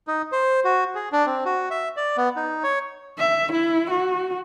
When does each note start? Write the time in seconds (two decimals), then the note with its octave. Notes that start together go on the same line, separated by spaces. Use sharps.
0.07 D#4
0.32 C5
0.64 F#4
0.95 G#4
1.12 D4
1.26 C4
1.45 F#4
1.71 E5
1.97 D5
2.17 B3
2.36 D#4
2.63 C#5
3.19 E5
3.52 E4
3.90 F#4